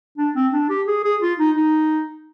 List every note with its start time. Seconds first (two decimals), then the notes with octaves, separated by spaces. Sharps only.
0.18 D4
0.35 C4
0.53 D4
0.70 G4
0.87 G#4
1.04 G#4
1.22 F4
1.39 D#4
1.56 D#4